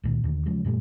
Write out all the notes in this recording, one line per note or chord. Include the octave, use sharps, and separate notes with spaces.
C#2 A#2 D#3
D#2 D3
C#3 F3 F#3 G#3
F#2 A#2 G3 A3